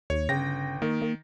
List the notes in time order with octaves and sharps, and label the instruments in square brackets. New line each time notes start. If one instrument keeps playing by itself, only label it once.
[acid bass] D#2 [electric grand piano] C#5
[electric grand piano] G1 G5 A#6 [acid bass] C#3
[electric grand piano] D#3 [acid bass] A#3
[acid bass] A#3